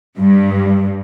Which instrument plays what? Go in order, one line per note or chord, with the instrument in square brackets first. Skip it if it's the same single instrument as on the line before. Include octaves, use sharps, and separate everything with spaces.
[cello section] G2